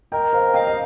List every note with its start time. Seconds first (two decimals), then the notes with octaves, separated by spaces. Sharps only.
0.12 A#4 D#5 G5
0.33 C5 F5
0.54 D#5 F5 G5
0.67 D#5